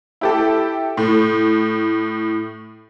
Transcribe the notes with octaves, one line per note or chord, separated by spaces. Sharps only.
E4 G4 A4
A2